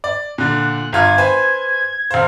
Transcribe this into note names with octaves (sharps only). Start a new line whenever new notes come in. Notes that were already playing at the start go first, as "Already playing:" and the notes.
D5
A#2 D3 F#6
G1 F4 F6 G#6
B4 C5 G#5
E1 C5 F5